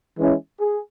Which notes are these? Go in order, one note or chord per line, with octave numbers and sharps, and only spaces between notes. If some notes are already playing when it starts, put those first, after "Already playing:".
E3 G#3 C#4 E4
G#4